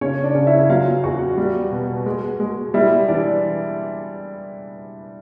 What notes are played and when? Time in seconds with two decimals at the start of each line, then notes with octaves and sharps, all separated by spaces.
0.01 C#3 C#4 C#5
0.24 D4 D5
0.35 C#3
0.46 E4 E5
0.69 F#3 F4 F5
1.03 E2 F#4 F#5
1.38 G3
1.72 B2
2.06 G#3
2.40 G#3
2.74 G3 E4 E5
3.08 E3 D4 D5